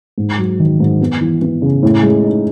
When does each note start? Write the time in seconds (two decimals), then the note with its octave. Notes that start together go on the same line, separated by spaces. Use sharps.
0.18 G#2
0.38 F#3
0.60 D#3
0.80 G#2
1.01 B3
1.21 E3
1.42 B3
1.62 C#3
1.83 A2
2.03 G#3
2.24 D#4